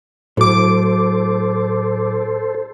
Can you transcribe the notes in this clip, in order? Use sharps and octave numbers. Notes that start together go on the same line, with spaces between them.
A2 F#3 A4 C5 D6